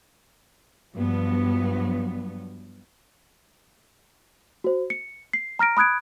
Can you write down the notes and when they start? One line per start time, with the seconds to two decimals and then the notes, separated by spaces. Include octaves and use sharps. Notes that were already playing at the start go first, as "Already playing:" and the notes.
0.95 G2 F3 F#3 B3
4.64 F#4 C5
4.90 C#7
5.33 C7
5.59 A#5 F6 A#6 D7
5.77 B5 D#6 F#6 G#6 D7